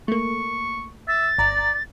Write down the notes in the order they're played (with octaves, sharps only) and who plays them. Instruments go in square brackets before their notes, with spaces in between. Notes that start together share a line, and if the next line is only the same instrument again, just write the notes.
[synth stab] A3 A#3 [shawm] C#6
[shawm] E5 [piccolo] A6
[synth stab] G1 A#5 [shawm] D5